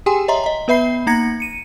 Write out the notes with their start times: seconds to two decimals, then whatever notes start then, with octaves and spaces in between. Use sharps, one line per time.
0.06 G4 G#4 G5 G#5 C6
0.28 C#5 D#5 E5 A#5 C6
0.44 D#5 A#5
0.68 B3 B4 E5 B5 C7
1.07 A#3 D#4 A#5 G#6 A#6 C#7
1.40 C#7 D#7